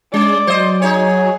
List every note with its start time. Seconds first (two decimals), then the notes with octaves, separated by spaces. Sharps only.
0.14 G#3 C#4 D5
0.47 F#3 C5 D#5
0.82 D#4 G#4 C#5